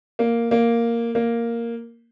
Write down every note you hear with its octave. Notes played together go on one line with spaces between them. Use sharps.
A#3
A#3
A#3